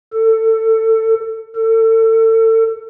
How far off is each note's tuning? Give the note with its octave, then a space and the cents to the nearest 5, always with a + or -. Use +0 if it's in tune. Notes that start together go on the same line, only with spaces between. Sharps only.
A4 +25
A4 +35